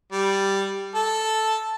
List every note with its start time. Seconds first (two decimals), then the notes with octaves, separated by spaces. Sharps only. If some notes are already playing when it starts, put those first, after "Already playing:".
0.12 G3
0.95 A4